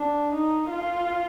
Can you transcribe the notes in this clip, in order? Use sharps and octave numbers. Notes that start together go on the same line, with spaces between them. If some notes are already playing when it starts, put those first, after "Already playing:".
Already playing: D4
D#4
F4